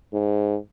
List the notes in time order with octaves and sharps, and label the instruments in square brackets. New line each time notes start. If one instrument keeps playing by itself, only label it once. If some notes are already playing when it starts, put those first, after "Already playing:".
[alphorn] G#2